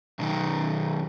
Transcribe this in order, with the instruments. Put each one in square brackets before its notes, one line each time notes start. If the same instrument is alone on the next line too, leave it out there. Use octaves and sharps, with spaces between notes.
[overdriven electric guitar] B1 D#3